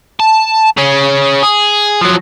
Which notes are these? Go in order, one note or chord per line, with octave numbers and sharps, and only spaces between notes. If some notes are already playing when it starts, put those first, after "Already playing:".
A5
C#3 C#4
G#4
F3 F#3